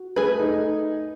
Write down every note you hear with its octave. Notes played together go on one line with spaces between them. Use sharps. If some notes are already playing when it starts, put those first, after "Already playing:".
Already playing: F#4
A3 G#4 B4
D#4